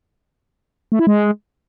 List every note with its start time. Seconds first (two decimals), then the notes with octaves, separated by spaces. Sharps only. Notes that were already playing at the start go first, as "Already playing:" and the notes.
0.92 A3
0.99 E4
1.07 G#3